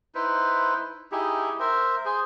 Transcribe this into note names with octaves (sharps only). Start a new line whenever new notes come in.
D#4 E4 B4 C5
D#4 E4 G4 G#4
A#4 C5 E5
G#4 C5